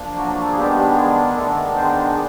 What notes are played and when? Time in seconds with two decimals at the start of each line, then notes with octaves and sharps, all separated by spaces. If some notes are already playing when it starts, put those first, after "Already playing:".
Already playing: F3 A#3 D4
0.16 F#3 F#4
0.42 A4
0.49 G#4
0.57 D#3 G3 G#3 B3 D4 G4
0.96 G#3 G#4
1.36 D#3 G#3 A3 B3 D4 A4
1.76 C4 C5